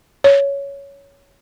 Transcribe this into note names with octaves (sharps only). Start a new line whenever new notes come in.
C#5